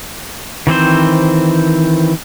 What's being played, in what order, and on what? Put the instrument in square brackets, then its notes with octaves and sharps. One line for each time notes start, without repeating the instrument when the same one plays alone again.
[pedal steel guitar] D#3 E3 C4 C5